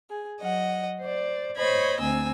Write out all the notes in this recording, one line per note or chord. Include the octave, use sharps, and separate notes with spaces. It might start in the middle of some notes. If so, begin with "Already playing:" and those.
G#4
F#3 D#5 F#5
C5 D5
C5 C#5 D#5 B5 G#6
D2 C4 G#5 E6